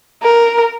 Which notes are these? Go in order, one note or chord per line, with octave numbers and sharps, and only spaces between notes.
A#4